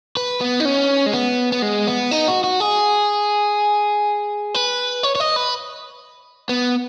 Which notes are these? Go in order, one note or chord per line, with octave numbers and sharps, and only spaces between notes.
B4
B3
D#4
C#4
G#3
B3
B3
G#3
B3
D#4
F#4
F#4
G#4
B4
C#5
C#5
D#5
B4
B3